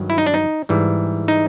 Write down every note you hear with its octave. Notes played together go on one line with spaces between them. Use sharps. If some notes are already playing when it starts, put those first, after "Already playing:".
Already playing: G2 D#3 F#3
E4
D#4
D4
D#4
G#2 E3 G3
D#4